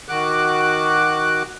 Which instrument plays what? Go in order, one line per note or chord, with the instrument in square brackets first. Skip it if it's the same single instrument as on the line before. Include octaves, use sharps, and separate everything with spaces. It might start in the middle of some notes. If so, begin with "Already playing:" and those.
[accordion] D#3 F#4 D6 F#6